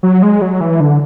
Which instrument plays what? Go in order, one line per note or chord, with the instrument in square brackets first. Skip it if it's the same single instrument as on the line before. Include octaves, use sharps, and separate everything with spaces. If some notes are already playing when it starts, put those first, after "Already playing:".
[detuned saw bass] F#3
G#3
F#3
E3
D3